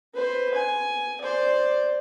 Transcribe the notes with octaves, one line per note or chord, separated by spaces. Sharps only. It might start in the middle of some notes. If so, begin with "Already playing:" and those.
B4 C5
G#5
C5 D5